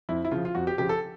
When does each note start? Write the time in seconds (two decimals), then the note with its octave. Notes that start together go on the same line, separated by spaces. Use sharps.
0.09 F2 E4
0.25 E4
0.31 C#3 F3 F4
0.45 F4
0.55 F2 F#4
0.67 G4
0.78 C#3 F3 G4
0.89 A4